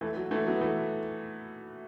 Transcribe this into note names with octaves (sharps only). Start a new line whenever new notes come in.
E3 A3
F#3
E3 A3
F#3 B3
E3 A3